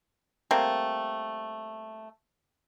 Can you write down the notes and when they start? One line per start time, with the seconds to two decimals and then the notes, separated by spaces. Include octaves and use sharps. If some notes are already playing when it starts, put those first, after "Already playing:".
0.51 G3 A3 A#3 C4